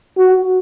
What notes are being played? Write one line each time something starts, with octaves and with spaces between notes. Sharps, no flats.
F#4